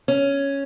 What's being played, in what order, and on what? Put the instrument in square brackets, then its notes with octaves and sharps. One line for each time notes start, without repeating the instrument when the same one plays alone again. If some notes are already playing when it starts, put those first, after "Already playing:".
[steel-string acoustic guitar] C#4